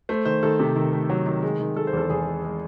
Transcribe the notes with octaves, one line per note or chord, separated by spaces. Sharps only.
A3 C5
D#3 C5
D#3 A4
C3
D#3
A3
F#3
D#3
G#3
D#3
G#3 A4
C5
E2 A4
E2 G#4
G#3
G#3